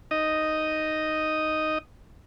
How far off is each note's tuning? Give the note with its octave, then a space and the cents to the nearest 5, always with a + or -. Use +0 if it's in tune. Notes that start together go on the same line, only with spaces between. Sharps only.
D#4 +0 D#5 +0